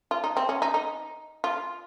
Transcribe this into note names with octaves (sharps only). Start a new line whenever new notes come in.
F4
D#4
C4
C#4
D#4
D#4
F4